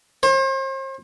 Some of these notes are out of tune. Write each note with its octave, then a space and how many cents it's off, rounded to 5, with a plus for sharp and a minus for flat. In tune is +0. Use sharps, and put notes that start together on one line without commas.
C5 +40